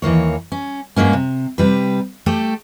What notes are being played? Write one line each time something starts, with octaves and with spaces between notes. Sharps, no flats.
D#2 E3 A#3 C#5
C#4
G2 F#3 G#3 A#3 C#4
C3
C3 G3 B4
A3 G4 A4